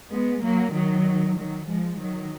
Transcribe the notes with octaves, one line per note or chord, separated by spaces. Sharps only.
G#3 B3
F#3 A#3
D#3 F#3
D#3 F#3
F3 G#3
D#3 F#3